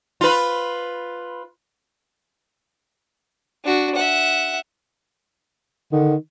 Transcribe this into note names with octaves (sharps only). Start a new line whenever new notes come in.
F4 B4
D4 F#4
E5 F#5
D3 D#3